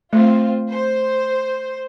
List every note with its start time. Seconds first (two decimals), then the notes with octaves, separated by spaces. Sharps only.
0.13 A3 C4 F4
0.71 C5